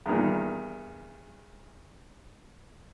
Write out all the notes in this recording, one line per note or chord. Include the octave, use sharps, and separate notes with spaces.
E2 G2 A#2 D#3